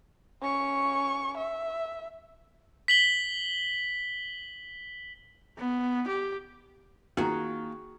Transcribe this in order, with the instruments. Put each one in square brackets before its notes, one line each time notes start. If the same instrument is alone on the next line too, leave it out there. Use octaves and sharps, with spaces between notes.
[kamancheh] C#4 C#6
E5
[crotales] B6 F#7 G7
[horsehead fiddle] B3
G4
[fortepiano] D#3 [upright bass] A#3 C4 [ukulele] F4 A#5 [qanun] F#4 G#4